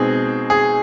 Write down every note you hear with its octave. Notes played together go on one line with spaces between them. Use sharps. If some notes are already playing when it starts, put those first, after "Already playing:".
Already playing: B2 G#3 C4 D#4 G#4
G#4